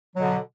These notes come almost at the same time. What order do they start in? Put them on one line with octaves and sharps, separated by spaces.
F#3 B2 D3